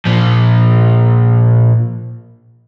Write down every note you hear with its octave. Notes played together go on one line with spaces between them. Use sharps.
A#2 F3